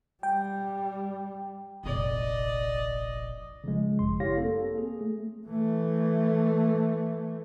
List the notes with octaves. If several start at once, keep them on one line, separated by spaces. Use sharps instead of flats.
G3 G5
F1 A#1 D5 D#5
C#3 F3 G#3
G#1 F#2 C6
E4 G4 C#5 F5 A#6
A#3 C4 A4
G#4
A3
E3 A3